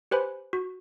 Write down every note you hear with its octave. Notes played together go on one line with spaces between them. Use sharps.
G4 B4 C5 G#5 B5
F#4